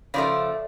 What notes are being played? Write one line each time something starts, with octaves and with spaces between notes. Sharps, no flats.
C#3 F3 A3 D5